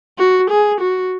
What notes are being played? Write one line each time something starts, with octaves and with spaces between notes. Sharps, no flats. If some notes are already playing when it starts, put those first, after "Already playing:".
F#4
G#4
F#4